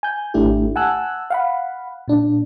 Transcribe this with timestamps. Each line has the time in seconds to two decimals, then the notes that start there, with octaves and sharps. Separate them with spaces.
0.03 G#5 G6
0.34 G#1 A3 D4 E4 G4
0.76 F#5 G#5 A5 E6 F#6
1.30 F5 F#5 B5
2.08 A#2 D4